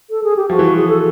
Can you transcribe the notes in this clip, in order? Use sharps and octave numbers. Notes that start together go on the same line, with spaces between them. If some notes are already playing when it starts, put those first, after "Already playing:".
A4
G#4
G4
F3 F#4
E3
F3
G#4
A4